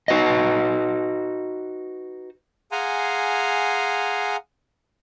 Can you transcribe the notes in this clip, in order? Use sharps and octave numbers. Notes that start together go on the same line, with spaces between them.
D#4 F#4 B4 D#5
G#4 F5 F#5 G#5 A#5 C6